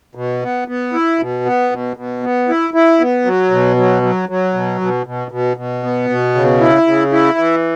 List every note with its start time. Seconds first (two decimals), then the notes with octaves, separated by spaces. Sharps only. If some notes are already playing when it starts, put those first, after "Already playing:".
0.15 B2
0.42 B3
0.68 B3
0.93 E4
1.19 B2
1.45 B3
1.71 B2
1.97 B2
2.23 B3
2.49 E4
2.74 E4
3.00 B3
3.25 F#3
3.51 B2
3.76 F#3
4.02 F#3
4.29 F#3
4.54 B2
4.81 B2
5.06 B2
5.31 B2
5.57 B2
5.83 B3
6.10 B2
6.35 C#3
6.60 E4
6.87 C#3
7.12 E4
7.38 E3